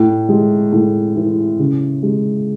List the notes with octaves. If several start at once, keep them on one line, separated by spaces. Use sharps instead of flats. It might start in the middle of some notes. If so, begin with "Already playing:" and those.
Already playing: A2
G#3
A2
E3
C#3
G#3